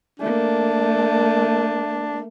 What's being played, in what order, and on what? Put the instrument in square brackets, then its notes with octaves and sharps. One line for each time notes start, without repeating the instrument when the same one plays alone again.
[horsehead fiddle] A3 A#3 [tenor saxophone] D4